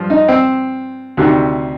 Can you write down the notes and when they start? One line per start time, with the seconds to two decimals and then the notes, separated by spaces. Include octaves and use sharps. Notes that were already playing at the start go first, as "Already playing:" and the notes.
Already playing: G2 F3
0.10 D#4
0.28 C4
1.17 D2 C3 D#3